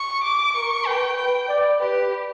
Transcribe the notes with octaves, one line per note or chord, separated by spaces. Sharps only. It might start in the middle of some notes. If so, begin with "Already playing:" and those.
Already playing: C#6
D6
A#4 C#6
B4 G5
B4 G5
D5
G4 B4